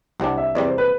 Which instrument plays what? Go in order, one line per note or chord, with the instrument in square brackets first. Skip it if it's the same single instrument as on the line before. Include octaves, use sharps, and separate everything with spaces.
[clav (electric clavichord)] C2 C3 G3 D4 [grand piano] F#5
[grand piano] E5
[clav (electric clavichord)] E2 C3 G3 [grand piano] D5
[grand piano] C5
B4